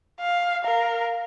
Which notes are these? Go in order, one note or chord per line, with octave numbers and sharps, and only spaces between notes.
F5
A#4 F5